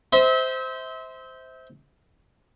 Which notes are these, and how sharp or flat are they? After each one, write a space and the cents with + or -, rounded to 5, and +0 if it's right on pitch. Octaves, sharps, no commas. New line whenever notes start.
C5 -10 E5 -35